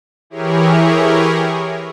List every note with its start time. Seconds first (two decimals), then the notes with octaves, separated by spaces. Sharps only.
0.30 E3 E4 G4 G#4 A#4 C#5